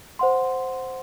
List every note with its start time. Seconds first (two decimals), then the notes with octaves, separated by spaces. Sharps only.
0.19 C5 F#5 C6